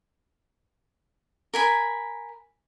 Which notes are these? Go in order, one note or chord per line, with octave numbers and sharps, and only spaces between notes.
A#4 G#5 B5